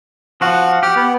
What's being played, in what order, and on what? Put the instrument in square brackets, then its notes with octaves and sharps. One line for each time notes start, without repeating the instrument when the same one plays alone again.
[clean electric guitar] F3 F#4 [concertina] F5 F#5
[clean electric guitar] G4 [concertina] F#5 F6
[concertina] B3